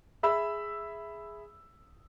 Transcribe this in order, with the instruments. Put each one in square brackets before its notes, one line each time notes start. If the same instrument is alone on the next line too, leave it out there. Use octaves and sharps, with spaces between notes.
[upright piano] G#4 E5 B5 E6